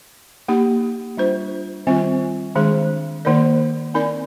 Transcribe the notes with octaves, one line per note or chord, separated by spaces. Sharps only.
A#3 D#4 G4
G3 D4 F4 C5
D#3 G3 C4 F4
D#3 G#3 D4 G#4
D#3 A#3 D#4 A#4 D5
C4 D#4 A#4 D5